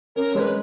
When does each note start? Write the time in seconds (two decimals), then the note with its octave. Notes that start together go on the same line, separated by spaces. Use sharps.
0.16 C#4 A#4
0.35 G#3 C#5
0.40 B4